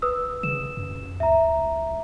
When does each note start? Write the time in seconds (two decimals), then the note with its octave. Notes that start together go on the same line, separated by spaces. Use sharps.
0.02 B4 D#6 E6
0.43 C#3 E7
0.77 F#2
1.20 C#2 E5 A#5